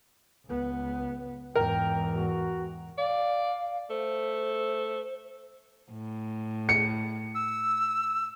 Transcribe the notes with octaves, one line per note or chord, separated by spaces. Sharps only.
C#2 B3
E2 G#2 A#4 G5
F#4
D5 F5
A3 C5
A2
C#7
E6